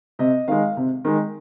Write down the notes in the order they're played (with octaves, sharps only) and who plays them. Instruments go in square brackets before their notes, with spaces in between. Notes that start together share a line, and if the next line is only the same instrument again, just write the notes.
[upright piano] C3 D#5
D#3 G#3 F5
C3
D#3 G#3